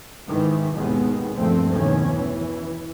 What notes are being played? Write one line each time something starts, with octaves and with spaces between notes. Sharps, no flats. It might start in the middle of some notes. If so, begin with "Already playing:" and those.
G#2 D#3 E3
G#1 D#2 B2 D#3 G#3 B3
D2 G2 A#2 F3 A3 C4
E2 B2 D#3 C#4
E3